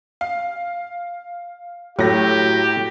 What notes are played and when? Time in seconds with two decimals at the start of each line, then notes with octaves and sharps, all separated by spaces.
0.21 F5
1.99 A2 F#3 A3 G4 A#6